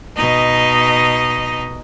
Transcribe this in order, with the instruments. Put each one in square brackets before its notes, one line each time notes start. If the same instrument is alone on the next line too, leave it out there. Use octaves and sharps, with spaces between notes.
[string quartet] B2 D#4 D#5